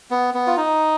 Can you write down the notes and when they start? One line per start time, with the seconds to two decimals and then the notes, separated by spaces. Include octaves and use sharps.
0.11 B3
0.34 B3
0.47 F4
0.57 D#4